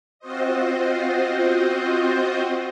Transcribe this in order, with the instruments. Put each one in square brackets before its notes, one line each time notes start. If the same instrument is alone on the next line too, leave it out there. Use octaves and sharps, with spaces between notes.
[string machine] C4 F4 F#4 C5 D#5